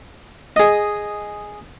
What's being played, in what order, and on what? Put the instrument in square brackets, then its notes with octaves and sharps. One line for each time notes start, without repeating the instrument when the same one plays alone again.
[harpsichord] G#4 D#5